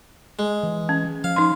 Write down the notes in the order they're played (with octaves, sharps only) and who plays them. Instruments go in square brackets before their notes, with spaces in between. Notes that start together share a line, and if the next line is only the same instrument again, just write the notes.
[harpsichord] G#3
[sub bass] E3
[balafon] C#4
[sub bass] F3 [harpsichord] F5
[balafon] D#4 C6